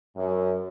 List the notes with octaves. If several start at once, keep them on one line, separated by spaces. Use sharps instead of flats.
F#2